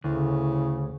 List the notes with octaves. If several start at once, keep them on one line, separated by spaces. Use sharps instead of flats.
D2 A2 C#3